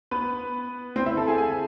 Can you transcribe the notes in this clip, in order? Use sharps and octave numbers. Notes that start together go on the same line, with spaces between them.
B3 B4
C4 C5
E4 E5
A4 A5
G#4 G#5
G#4 G#5